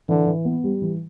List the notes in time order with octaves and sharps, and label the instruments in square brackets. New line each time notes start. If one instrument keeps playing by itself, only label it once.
[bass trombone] D3 [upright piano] E3
[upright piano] E3
B3
G3
E3